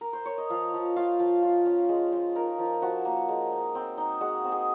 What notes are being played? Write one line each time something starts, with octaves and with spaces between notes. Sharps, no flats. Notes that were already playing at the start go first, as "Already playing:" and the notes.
A#4
C5
C#5
D#5
F3 F5
F3
F4 F5
F3
F4
C#4
G#3
G#3
D#4 A#4
F3
F3 F#4
A#3
G#3
D#4
C4
D#4
G#3 F#4
C4
G#4